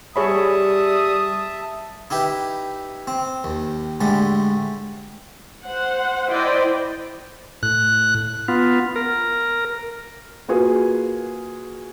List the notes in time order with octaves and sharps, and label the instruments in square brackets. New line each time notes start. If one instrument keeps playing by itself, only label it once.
[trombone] G3 [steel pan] G#4 C#5 B5 [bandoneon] E5 A5 [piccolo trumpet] D#6
[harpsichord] D#4 E4 G4 B4
C4
D#2
A2 D3 G3 G#3
[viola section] C5 F#5
E4 C5 D5 D#5 G5
[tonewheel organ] A2 F#6
B3 F4
A#4
[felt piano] A#3 F4 F#4 G#4 B4